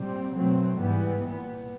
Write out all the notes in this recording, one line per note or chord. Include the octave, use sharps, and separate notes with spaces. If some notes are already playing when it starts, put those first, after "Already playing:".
Already playing: A#2 G3 C4
B2 F#3 A3 C4
G#2 E3 G3 B3
A#2 G3 B3